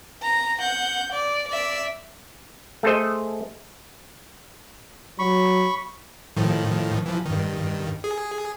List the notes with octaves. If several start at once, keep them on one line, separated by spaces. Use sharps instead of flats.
A#5
F#5 G6
D5
D5 E5
A3 G#4 A4 C5 D#5
F#3 B5 C#6
A2 D#3 F3
E3 F3
G2 D#3
G#4